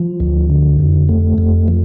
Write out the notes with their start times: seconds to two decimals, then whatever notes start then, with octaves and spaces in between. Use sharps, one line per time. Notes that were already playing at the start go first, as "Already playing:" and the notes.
Already playing: F3
0.20 D2
0.50 D3
0.79 F2
1.09 A3
1.38 F2
1.68 F3